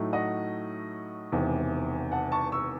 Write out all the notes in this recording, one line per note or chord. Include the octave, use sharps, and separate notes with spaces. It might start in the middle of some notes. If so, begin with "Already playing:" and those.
Already playing: A2 F#3 A3 D#4
D#5 F#5
E1 E2 C3 D#3
F#5 A5
A5 C#6
C#6 E6